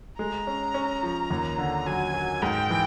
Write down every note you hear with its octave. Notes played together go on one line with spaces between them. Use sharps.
G#3 A#5
C#4
C#4
F3
D#2
D3
F#3 G#5
F#3
G#2 G5
E3